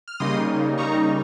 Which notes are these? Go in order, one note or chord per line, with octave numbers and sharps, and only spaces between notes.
F6
C#3 G3 A#3 D#4 C6 D#6
C#3 G3 A#3 D#4 A#5 C#6